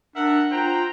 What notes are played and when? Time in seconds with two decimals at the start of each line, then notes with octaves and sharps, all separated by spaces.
0.16 D4 A#4 E5 F#5
0.51 F4 C5 G5 A#5